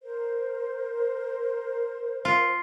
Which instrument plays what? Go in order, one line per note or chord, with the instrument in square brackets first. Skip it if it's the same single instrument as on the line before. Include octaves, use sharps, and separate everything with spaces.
[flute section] A#4 C5
[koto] F4